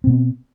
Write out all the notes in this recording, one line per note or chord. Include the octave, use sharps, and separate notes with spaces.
B2 B3 C4